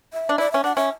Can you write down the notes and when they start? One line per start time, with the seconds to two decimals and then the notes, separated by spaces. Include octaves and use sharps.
0.13 E5
0.29 D4
0.38 E4 D5
0.52 C#4 E5
0.64 D4 F#5
0.76 C#4 E5